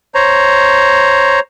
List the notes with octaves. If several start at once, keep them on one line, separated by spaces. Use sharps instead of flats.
C5 C#5 A#5